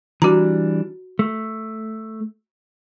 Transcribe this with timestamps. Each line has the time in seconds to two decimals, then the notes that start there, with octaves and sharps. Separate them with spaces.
0.22 E3 G3 D4 F#4 A#5
1.19 A3